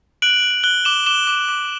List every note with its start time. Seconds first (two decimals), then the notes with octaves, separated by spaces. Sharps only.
0.22 F#6 D7 F#7
0.42 F#6
0.64 F#6 G7
0.85 D6 E7 G7
1.06 D6 E7 G7
1.27 D6
1.49 D6